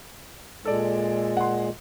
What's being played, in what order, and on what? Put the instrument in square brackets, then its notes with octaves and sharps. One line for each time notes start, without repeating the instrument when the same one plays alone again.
[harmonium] A#2 G#3 [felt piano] A4 D5
[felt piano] F#5 C6